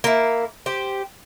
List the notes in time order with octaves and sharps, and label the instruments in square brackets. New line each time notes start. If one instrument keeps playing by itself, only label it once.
[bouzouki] A#3 E4
G4 C5